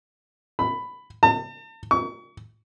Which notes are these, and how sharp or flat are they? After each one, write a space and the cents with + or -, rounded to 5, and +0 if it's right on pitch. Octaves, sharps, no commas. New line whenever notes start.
B5 +10
A5 +40
C#6 +35